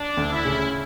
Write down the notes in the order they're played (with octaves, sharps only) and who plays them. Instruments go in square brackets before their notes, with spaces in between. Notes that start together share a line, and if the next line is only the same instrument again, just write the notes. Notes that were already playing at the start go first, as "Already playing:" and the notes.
Already playing: [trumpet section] D4
[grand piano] D2
[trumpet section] E4
[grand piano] C#3